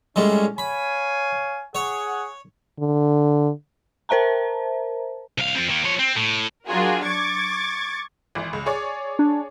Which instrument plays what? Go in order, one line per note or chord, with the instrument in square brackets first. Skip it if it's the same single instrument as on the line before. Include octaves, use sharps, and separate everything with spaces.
[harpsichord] A2 G3 G#3 [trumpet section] C#4
[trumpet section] C#5 F5 G#5 [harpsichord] B5
[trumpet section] G#4 F#5 [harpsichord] C#5
[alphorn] D3
[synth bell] A#4 C5 E5 A5 A#5
[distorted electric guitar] C2 F5
F3 C4
D#3 A#3
F3 C#5
C4
A2
[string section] F#3 D4 F4 F#4 G#4 A#4
C#6 D6 G#6 A6
[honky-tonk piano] G#1 E3
C#2
G#4 C#5 D5
[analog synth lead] D4